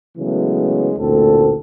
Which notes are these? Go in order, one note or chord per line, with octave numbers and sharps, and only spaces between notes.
C#3 E3 F#3 G#3 A3 B3
A1 D2 A#2 C4 A4